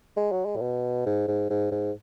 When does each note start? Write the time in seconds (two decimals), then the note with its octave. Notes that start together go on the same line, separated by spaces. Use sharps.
0.17 G#3
0.32 F#3
0.46 G#3
0.56 A2
0.61 B2
1.06 G#2
1.28 G#2
1.50 G#2
1.72 G#2